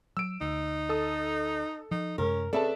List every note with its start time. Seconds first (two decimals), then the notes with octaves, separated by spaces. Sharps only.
0.17 F#3 E6 D7
0.41 D2 D#4
0.89 A4 A5 D#6
1.91 F3 D#4
2.18 F#2 C3 G#3 C#4 A#4
2.53 C#3 C4 A4 B4 D5 E5 A5